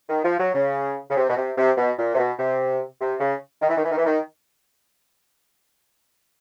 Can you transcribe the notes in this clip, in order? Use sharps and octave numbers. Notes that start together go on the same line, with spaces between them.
D#3
F3
F#3
C#3
C#3
C3
B2
C3
C3
B2
A#2
C3
B2
C3
C3
C#3
D#3
E3
D#3
E3
D#3
E3
D#3